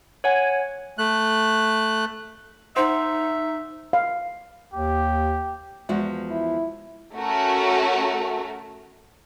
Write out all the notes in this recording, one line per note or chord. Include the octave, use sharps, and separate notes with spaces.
C#5 F#5 G#5
A3 F#6
D#4 C5 E5 F#5 C6
F5
D#2 G4
E2 F3 G#3 F#4
E4
A3 C#4 F#4 A#4